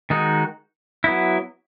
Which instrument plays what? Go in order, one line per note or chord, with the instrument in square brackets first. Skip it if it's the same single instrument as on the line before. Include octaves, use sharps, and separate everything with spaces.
[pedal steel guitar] D#3 G#3 D#4 F#4
F#3 B3 E4